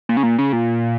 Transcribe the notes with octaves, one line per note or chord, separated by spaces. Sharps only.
A#2
C#3
A#2
C#3
A#2